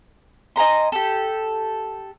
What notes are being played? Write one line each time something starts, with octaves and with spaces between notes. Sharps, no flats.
D#5 G#5 A#5 C6
G4 A4